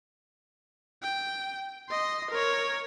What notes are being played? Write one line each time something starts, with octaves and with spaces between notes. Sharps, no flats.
G5
D#5 C6
A#4 C#5